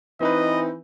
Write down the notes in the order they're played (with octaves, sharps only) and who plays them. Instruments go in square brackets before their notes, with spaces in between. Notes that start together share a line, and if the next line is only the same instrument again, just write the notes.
[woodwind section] E3 [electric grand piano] C4 D#4 B4 [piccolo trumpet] D#5